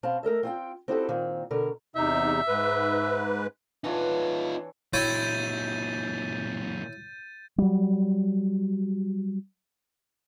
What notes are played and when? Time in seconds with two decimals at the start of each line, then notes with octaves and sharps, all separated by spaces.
0.03 B2 C4 F5 A5
0.23 A3 A#4 D#5 E5
0.43 C4 F4 G5
0.88 C4 D#4 E4 F#4 G4 A4
1.09 A#2 D#3 C4
1.51 B2 D3 A#4
1.96 E2 C3 D#4 E5
2.47 G#2 B4
3.84 E3 D4 D#4 F4 C#5
4.93 A#2 F#3 E4 C#5 G5 G6 A6 D#7
7.58 F#3 G3